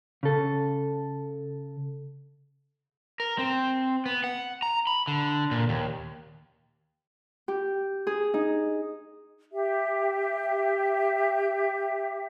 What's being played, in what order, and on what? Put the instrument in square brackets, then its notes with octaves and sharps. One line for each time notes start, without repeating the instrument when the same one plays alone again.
[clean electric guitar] C#3 A4
[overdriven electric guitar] A#4
C4
B3
F#5
A#5
B5
D3
A#2
D#2
[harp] G4
G#4
D#4
[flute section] G4 E5